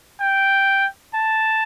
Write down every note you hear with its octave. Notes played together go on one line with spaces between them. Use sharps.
G5
A5